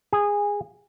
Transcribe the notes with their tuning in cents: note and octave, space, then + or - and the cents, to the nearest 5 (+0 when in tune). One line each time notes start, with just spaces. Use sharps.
G#4 -15